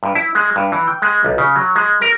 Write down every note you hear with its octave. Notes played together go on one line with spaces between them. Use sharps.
G2
E4
G#3
G2
E3
G5
G#3
B1
C#3
F#3
G#3
A#4